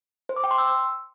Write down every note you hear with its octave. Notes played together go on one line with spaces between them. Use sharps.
C5
D6
G5
C6
E6